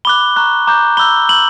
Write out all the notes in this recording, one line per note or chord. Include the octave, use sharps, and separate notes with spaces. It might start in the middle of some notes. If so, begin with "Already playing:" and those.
B5 D6 F#6 G7
A#5 C#6 F#6
A#5 D6 G6
B5 E6 G6 G7
B5 E6 G6 F#7